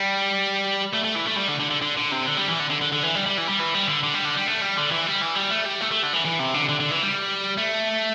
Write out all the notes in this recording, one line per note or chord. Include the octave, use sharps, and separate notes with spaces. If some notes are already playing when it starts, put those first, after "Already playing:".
Already playing: G3
A3
A3
E3
A3
G3
D3
D3
D3
D3
D3
C3
D3
G3
E3
D3
D3
D3
D3
E3
G3
G3
E3
G3
E3
G3
D3
D3
G3
D3
G3
A3
G3
D3
E3
G3
E3
G3
A3
G3
A3
A3
D3
E3
E3
C3
D3
D3
D3
E3
G3
A3